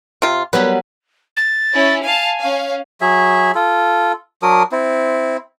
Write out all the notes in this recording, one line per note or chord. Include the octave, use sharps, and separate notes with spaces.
C3 F4
F#3 G3 B3 B4
A6
C#4 E4
F5 G#5 A5
C#4 F5
F#3 G#4 E5
F4 A4
F#3 D4 A#4 D#6
C4 E4